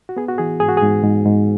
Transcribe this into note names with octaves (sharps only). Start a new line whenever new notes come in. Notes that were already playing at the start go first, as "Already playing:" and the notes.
F#4
B3 G#4
F#4
E3 G#4
G#2 G#4
F#4
G#4
G#2
G#2
G#2